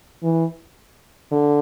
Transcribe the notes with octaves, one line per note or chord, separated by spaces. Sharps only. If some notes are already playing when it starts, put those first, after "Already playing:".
E3
D3